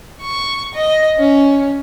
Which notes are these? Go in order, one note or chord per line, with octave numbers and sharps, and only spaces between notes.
C#6
D#5
C#4